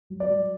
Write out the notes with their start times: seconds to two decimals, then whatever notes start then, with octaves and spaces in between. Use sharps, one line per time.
0.10 F#3
0.20 D5
0.30 F#3